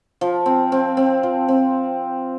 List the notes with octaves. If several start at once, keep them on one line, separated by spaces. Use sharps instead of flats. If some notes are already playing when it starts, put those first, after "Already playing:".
F3
C4
C4
C4
F3
C4